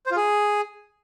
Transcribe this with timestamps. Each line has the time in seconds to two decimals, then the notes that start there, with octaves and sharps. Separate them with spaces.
0.06 C5
0.11 F4
0.16 G#4